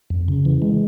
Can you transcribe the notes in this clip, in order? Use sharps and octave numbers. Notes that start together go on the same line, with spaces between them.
F2
C#3
E3
G#3